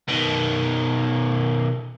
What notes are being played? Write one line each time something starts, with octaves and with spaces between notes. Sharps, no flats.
B2 D#3